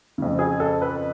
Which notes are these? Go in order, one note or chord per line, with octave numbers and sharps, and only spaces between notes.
F2 C#3
G#4
A4
B4